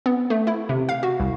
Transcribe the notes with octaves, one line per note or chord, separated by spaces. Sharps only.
B3
A3
E4
C3
F5
F#4
C2